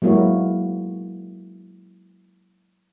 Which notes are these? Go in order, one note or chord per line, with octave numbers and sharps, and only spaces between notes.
F#3 G#3 A#3 E4 F#4 C#5